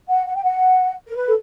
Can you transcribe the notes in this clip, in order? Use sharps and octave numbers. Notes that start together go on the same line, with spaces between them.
F#5
F#5
G5
F#5
A#4
B4
A4